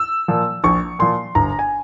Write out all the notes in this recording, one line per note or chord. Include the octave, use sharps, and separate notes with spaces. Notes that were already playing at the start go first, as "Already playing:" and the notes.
Already playing: E6
A#2 F3
A#1 C#6
A#2 F3 C6
G1 A#5
G#5